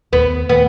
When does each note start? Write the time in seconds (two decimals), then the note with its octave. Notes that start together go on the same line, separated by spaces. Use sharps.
0.13 D#2 B3
0.49 D#3 A3 B3